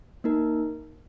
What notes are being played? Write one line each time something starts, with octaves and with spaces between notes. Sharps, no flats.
A#3 D#4 A#4